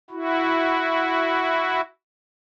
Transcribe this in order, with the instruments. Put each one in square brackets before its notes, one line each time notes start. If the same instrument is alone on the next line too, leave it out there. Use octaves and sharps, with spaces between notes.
[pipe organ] E4 F#4